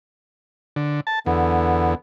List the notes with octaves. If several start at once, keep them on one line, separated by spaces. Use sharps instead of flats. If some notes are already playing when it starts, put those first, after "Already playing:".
D3
A5
E2 D3 B3